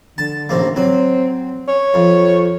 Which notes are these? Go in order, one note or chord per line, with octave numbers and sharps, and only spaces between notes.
D3 A5
A1 C3 A#3
F#3 C4
C#5
F2